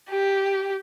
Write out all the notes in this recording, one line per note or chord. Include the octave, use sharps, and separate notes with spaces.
G4